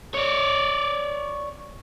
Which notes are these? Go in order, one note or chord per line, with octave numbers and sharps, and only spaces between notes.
C#5 D5